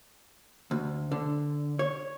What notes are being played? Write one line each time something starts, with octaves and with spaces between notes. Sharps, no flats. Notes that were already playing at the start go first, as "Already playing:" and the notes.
D2
D3
C#5